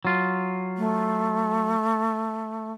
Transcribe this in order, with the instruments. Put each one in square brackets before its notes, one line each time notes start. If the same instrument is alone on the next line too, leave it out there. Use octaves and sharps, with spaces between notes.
[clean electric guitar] F#3 F4
[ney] A3